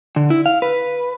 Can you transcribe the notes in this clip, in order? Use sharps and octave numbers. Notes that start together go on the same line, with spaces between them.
D3
E4
F5
B4